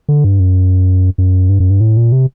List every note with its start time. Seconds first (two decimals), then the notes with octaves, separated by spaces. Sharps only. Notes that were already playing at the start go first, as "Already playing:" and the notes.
0.09 D3
0.24 G2
0.40 F#2
1.18 F#2
1.49 G2
1.60 F#2
1.70 G2
1.81 A2
1.97 A#2
2.12 C3